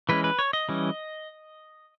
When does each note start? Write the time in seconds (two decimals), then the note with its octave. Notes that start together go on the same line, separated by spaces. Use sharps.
0.09 E3 G#3 C#4 B4
0.24 B4
0.39 C#5
0.53 D#5
0.69 E3 G3 C#4